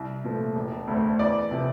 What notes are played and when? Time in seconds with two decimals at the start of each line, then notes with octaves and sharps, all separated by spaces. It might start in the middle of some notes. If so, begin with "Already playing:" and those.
Already playing: C2
0.24 A#2 F3 A3
0.55 E1
0.87 D2 D3 A3 C4
1.19 E2 D5
1.51 C3 F3